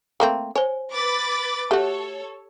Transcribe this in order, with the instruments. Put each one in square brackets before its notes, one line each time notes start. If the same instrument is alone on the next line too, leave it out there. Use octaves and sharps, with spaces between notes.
[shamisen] A3 A#3 C4
[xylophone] C5 G#5 [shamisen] C#5
[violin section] B4 D6 A6
[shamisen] A3 F#4 [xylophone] G4 [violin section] A4 C#5